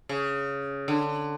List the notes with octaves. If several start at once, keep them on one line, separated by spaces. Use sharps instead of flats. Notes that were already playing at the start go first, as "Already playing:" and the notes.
C#3
D3